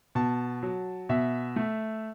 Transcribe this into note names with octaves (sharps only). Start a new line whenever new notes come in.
B2 A5
F#3
B2 E5
A3